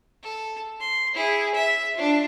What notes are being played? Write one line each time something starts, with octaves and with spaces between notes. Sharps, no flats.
A4
C6
E4 G#4
E5
D4 F4